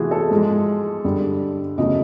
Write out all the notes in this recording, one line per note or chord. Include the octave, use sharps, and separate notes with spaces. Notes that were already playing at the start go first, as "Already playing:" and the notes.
Already playing: C3 E3 A3 F4 F#4 G#4
A4
G#2 F3 G#3
G2 D3 G3
E2 C#3 F#3 A3 D#5